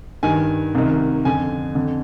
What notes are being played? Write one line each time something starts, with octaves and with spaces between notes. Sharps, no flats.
G2 D#3 G#5
C2 C3 D#3
F2 D3 G#5
F2 D3